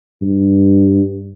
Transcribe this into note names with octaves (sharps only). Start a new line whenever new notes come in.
G2